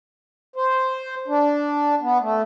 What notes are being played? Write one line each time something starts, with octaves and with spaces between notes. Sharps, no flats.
C5
D4
B3
A3